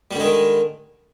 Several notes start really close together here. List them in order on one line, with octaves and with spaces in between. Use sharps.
G3 D3 G#3 D#3